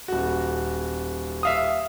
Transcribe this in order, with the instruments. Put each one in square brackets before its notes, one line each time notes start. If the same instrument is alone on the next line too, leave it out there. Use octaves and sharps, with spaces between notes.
[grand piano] D#1 F#4
[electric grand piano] E5 F5 D#6